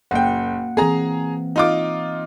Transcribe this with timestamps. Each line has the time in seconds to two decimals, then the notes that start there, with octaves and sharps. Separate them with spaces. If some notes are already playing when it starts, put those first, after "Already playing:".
0.11 F#1 A#3 F#5 G5
0.77 E3 C4 G#4 A#5
1.56 D#4 F4 D6